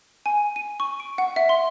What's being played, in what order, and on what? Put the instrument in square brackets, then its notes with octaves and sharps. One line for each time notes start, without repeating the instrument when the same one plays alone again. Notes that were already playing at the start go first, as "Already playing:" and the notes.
[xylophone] G#5
D#7
C#6
D7
F#5
E5
C6